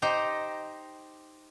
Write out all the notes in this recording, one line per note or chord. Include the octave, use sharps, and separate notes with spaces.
D#4 G4 C5 A#5